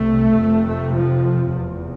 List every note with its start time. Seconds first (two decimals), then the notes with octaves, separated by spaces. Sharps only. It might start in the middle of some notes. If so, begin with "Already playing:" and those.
Already playing: C2 C3 A3
0.36 F1 F2 C3
0.66 A3
0.95 F3
1.53 F1 E2 C3